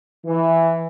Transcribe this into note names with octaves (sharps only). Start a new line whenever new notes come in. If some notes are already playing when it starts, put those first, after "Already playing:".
E3